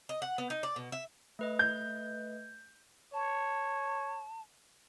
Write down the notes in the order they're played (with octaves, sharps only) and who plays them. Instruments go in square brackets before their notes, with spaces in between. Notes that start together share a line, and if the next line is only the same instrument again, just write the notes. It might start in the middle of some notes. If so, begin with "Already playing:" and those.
[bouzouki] D#5
F#5
B3
D#4
D5
B2
E5
[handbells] A3 B4 D#5
[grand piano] G6
[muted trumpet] C#5 [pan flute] A5